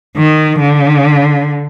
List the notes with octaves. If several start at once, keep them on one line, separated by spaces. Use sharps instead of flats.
D#3
D3